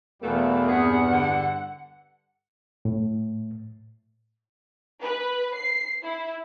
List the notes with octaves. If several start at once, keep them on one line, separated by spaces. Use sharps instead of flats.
E2 B2 G3 A3 A#3
G2 C3 B3 G#4 F#5
D3
A2
B4
C7
E4